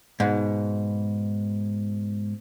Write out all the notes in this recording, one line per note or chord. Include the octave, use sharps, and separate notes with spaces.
G#2 B2